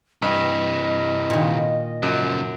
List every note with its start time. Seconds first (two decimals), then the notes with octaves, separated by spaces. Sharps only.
0.22 G2 C3 E3 D#5
1.30 A#2 D#3
2.03 F#2 C#3 F3